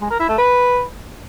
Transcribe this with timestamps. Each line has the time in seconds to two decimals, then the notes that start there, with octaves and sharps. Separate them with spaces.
0.01 G#3
0.10 A#4
0.20 E4
0.29 A3
0.38 B4